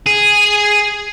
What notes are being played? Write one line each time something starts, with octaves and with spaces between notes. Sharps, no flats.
G#4